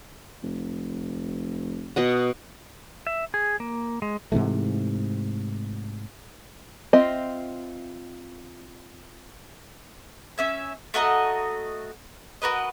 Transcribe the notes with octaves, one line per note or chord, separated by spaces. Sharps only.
F1
B2 D#5 F#5
E5
G#4
A#3
G#3
G#2 C3 E3 A3
C4 F4 D#5 E5
C#4 E5 G#5
A3 F#4 D#5 A#5
F#4 A#4 B4 D#5